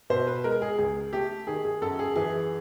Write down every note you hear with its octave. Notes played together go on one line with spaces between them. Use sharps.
B2 C5
B4
G#3 A#4
G#4
C#2 G#4
A3 G4
D#3 G#4
G#4
F#2 A4
G#4
E3 G#4